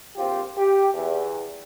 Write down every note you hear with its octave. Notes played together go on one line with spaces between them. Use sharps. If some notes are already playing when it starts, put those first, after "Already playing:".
A#1 C4 F4 G4
G4
E2